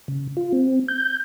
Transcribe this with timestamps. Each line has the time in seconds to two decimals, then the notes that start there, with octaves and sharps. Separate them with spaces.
0.08 C#3
0.37 F4
0.53 C4
0.88 G6